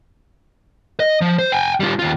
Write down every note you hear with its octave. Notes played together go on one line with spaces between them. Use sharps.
D#5
F3
C5
G5 G#5
G3 F4
D#2 F4